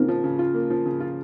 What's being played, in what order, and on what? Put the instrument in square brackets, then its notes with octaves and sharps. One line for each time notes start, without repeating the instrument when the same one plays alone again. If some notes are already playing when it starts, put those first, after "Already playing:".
Already playing: [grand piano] C#3 A#3 F4 [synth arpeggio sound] C4 D#4
[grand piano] F3
C#3
F4
A#3
F3
C#3
F4